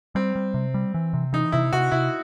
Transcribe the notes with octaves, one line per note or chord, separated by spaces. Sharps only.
G3 C4
G3
C3
G3
E3
C3
E3 D#4
C3 E4
C3 F#4
C3 E4